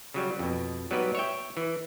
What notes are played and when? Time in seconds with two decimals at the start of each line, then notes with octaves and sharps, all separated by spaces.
0.14 C#3 F#3 G3
0.39 F2 B2
0.91 F#3 G3 B3 D#4 B4 D5
1.15 C#5 E5 G5
1.57 E3